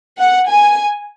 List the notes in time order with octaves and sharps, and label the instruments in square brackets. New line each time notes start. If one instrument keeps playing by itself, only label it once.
[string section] F#5
G#5